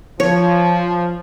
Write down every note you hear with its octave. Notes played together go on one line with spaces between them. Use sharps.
F3 C#5